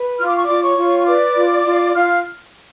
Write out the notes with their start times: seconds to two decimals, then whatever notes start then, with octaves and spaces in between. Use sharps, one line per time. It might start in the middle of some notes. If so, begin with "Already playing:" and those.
Already playing: B4
0.19 F4 F6
0.27 D6
0.36 C#6
0.45 F4 D5 D6
0.62 C#5 C#6
0.77 F4
0.99 C#6
1.07 B4 D5 D6
1.36 F4
1.65 F4
1.95 F4 F5 F6